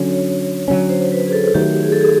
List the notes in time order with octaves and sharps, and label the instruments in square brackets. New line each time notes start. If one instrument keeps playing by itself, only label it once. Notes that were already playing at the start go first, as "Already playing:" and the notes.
Already playing: [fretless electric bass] D3 F#3 C#4
[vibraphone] C#5
[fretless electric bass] D3 F#3 A3 C#4
[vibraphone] C5
B4
G#4
A4
[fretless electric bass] D#3 F#3 A3 [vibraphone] G4
[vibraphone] G#4
A4
G#4